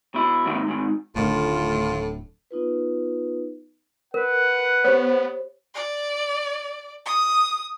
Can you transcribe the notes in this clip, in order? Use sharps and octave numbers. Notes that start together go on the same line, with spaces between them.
B2 E4
G#2 D#3 A#3
G#2 D#3
D1 A2 D3 D#3 A3 F4
B3 D#4 F4 B4
A#4 B4 F#5
B3 G4 C5 C#5
D5
D#6